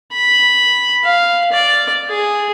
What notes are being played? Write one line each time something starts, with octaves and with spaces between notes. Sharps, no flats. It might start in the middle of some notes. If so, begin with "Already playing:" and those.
B5
F5
D5
G#4